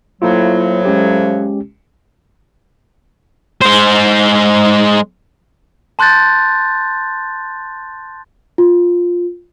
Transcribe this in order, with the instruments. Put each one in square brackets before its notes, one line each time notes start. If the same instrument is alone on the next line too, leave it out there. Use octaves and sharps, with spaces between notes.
[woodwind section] A2 F3 F#3 [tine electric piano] A#3 E4 F4
[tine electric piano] G#3 C#4 G4
[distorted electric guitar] G#3 C5
[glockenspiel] A5 C6 F#6 G6 A6
[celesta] F4